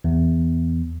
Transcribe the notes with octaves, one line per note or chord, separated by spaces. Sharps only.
E2